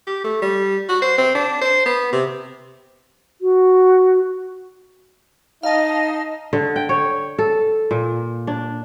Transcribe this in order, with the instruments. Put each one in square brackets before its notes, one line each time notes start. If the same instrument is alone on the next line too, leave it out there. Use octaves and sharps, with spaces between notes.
[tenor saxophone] G4
A3
G3
F#4
C5
C4
D4
C5
B3
C3
[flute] F#4
[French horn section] D#4 [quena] D#5 [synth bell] F5 A5
[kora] D3
G5
C#5
A4
A#2
D4